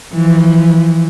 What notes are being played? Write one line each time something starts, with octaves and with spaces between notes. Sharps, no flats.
E3 F3